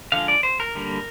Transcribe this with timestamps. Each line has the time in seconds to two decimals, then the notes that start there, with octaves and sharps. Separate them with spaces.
0.12 D3 F3 G#3 F5
0.28 D5
0.43 C5
0.60 A#4
0.75 D3 G3 A#3